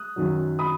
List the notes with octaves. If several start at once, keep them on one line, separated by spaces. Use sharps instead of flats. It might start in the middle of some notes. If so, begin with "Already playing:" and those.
Already playing: D#6 F#6
F#2 D#3 F#3
B5 D#6